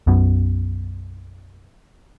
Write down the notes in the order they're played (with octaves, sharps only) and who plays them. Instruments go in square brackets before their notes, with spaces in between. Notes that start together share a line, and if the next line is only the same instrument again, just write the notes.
[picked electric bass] B1 F#2 B2